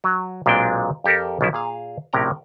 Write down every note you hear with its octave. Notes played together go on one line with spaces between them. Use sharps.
F#3
B1 A#2 G#3 C4 D4 G5
F2 G4 A4 A#4
B1 C#3 F3 E4
A#2 G#4 F5
A#1 A2 C3 C#4 G5 A#5